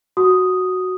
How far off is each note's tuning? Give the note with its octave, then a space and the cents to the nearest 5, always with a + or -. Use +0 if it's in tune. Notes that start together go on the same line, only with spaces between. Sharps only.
F#4 +0 D#6 +0